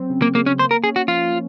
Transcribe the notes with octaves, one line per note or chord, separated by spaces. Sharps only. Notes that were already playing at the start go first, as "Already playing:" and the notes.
Already playing: F#3 C4
C#3
A#3
C#3 A#3
C#4
A#3 C5
A#4
C#4 G#4
F#4
F3 F4
F3